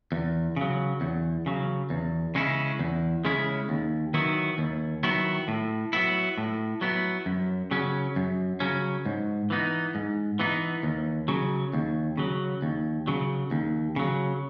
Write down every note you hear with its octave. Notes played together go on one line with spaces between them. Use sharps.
E2
C#3 F#3
E2
C#3 F#3
E2
C#3 G#3 C#4 E4
E2
C#3 G#3 C#4 E4
D#2
D#3 F#3 B3 E4
D#2
D#3 F#3 B3 E4
A2
F#3 B3 E4
A2
F#3 B3 E4
F#2
C#3 F#3 C#4
F#2
C#3 F#3 C#4
G#2
E3 B3 D#4
G#2
E3 B3 D#4
D#2
C#3 F#3
D#2
C#3 F#3
D#2
C#3 F#3
D#2
C#3 F#3